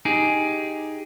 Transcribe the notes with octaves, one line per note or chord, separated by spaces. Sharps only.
D#4 G4 G#4